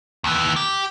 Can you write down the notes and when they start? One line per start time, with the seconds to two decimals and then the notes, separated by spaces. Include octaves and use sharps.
0.24 D#2 E3
0.56 G4